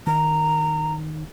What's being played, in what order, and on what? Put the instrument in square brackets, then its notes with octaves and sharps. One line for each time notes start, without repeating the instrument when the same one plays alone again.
[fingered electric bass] D#3 [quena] A#5